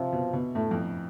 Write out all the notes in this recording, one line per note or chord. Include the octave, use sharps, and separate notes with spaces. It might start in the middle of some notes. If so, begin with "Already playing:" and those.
Already playing: C3 F3
B2
B2
A2 A3
F2